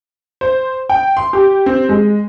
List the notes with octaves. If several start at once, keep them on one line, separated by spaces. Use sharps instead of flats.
C5
G5
C6
G4
C4
G#3